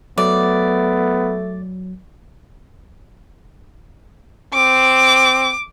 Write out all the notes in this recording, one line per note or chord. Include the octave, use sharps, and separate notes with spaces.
F#3 A3 B3 D5
C4 D6